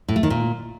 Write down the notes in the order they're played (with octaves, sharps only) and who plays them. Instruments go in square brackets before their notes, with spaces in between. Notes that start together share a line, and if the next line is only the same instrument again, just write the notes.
[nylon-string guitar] A2
A3
D#3
A#2